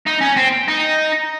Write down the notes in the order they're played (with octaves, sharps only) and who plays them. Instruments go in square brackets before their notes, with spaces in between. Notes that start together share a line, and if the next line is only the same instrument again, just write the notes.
[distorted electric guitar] D#4
C#4
C4
D#4